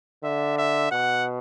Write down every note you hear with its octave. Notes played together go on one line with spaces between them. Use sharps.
D3 E5
E5
B2 F#5